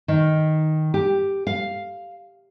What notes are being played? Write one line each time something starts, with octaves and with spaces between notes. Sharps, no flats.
D#3
G4
F5